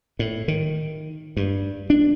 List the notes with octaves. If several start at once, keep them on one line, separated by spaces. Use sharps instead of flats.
A2
D#3
G2
D4